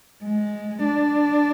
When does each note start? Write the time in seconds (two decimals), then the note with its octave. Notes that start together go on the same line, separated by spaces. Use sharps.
0.23 G#3
0.84 D4